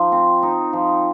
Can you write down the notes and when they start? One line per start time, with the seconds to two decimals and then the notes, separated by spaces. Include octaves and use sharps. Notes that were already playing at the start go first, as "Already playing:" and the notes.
Already playing: F3 D#4
0.12 C4
0.43 D#4
0.73 F3